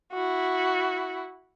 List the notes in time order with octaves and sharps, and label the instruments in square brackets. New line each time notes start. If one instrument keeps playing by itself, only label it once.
[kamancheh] E4 F#4